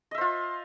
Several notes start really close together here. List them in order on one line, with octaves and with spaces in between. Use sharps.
D#5 E5 C5 F4